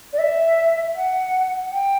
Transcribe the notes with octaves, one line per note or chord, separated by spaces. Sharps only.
D5
E5
F#5
G5